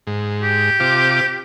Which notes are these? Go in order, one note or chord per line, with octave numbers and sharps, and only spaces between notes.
G#2
G4
C3 F4 D6